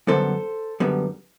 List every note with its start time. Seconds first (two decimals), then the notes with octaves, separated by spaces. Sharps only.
0.07 F#2 D3 G3 B3 A4 C5
0.80 F#2 D3 G3 B3